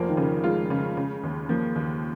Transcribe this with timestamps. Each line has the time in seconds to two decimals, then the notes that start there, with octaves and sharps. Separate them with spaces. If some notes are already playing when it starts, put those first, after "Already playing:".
Already playing: F1 F3 A#3
0.09 D#3
0.17 C#3
0.44 G#3 F4
0.70 C#3
0.97 C#3
1.23 D#2
1.49 F3 A#3
1.76 D#2